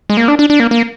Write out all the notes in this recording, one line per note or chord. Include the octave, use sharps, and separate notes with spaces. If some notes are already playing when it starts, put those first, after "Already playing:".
G#3
A#3
D4
D4
D4
A#3
A#3